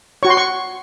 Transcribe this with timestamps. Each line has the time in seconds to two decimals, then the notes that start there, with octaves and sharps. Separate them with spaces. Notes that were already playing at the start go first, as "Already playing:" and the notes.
0.23 F#4 C#5 C#6
0.30 C6
0.37 C#6